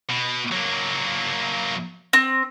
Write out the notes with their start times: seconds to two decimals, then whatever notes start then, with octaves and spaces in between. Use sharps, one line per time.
0.10 B2
0.51 F#3 A#3
2.13 C4